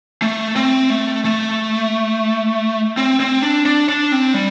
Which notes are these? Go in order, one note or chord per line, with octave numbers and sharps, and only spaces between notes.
A3
C4
A3
A3
C4
C4
D4
D4
D4
C4
G3